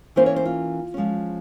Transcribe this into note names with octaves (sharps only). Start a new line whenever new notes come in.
E3 A#3 C#4 C5
C#5
C5
F4
F3 G#3 C#4